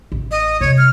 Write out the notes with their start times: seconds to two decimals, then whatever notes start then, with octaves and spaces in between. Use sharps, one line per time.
0.12 A1
0.31 D#5
0.61 C3 G3 C#5
0.78 F6